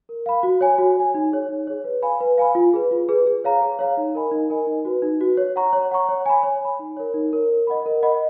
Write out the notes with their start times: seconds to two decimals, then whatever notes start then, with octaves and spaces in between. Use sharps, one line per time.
0.09 A#4
0.26 F5 B5
0.43 F#4
0.61 C#5 G#5
0.78 F#4
0.97 C#5 G#5
1.14 D#4
1.32 G#4 C#5
1.49 D#4
1.67 G#4 C#5
1.84 B4
2.02 F5 G#5 B5
2.20 B4
2.38 F5 G#5 B5
2.55 F4
2.73 G#4 B4
2.91 F4
3.09 G#4 B4
3.27 G#4
3.44 C#5 F5 A#5
3.61 G#4
3.79 C#5 F5 A#5
3.97 D#4
4.15 A#4 D#5 G#5 B5
4.31 D#4
4.50 A#4 D#5 G#5 B5
4.67 D#4
4.85 F#4 B4
5.02 D#4
5.20 F#4 B4
5.37 C#5
5.56 F#5 A#5 C#6
5.73 C#5
5.91 F#5 A#5 C#6
6.09 C#5
6.26 G#5 B5
6.43 C#5
6.61 G#5 B5
6.79 D#4
6.97 A#4 C#5
7.14 D#4
7.33 A#4 C#5
7.50 A#4
7.67 D#5 F#5 B5
7.86 A#4
8.03 D#5 F#5 B5